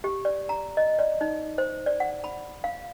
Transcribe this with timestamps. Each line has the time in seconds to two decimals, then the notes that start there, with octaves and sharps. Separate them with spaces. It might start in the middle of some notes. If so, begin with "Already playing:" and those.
0.04 G4
0.25 D5
0.49 A#5
0.77 D#5
0.99 D5
1.21 D#4
1.58 C5
1.86 D5
2.00 F#5
2.24 B5
2.64 F5